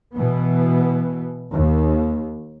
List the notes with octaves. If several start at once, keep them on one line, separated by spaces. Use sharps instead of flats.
B2 E3 B3
D#2